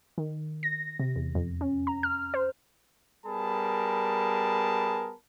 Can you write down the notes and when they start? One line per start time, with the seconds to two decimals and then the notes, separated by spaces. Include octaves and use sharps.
0.18 D#3
0.63 A#6
0.99 C3
1.16 E2
1.35 F2
1.61 C#4
1.87 A#5
2.03 F6
2.34 C5
3.26 G3 B3 G#4 A#4 A5 B5